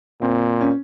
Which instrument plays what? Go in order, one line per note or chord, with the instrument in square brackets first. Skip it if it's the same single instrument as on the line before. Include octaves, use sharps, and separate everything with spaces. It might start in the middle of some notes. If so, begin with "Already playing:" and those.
[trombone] A#2 [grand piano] C4
[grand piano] C#4